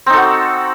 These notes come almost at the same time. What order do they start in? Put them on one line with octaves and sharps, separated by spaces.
C4 D#4 A4 F#4